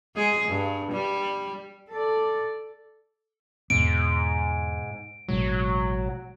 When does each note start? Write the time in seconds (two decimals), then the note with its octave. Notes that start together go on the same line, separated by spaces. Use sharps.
0.15 G#3 G#4
0.48 G2
0.92 G3
1.90 A4 D5
3.70 E2 G#2 B2 B3 D7
5.29 A1 B2 F#3 G#3